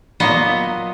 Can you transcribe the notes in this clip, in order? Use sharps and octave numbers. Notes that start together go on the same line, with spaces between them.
A#2 F#3 B3 D#5